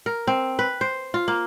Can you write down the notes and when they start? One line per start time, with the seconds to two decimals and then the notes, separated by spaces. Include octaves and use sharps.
0.06 A#4
0.27 C4
0.59 B4
0.81 C5
1.14 F4
1.28 A#3